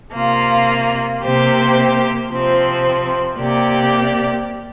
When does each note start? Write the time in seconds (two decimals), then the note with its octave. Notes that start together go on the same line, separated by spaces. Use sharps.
0.14 C3 A#3 F4
1.23 C3 A#3 G4 C5
2.30 C3 F3 C4
3.38 C3 A#3 G4 D5